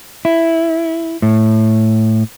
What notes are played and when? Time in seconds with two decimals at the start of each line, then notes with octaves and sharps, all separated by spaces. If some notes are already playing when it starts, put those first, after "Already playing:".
0.25 E4
1.22 A2